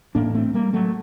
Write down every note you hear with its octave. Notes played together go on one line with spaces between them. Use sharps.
A1 A2 A#3 D4
A3 C4
G3 A#3
F#3 A3